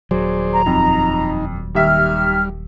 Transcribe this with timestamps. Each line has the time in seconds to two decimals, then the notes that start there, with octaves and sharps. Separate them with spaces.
0.11 D#1 F#3 G#4 C5 D5
0.52 A#5
0.66 F2 D#4
1.75 D#2 G3 E5 F6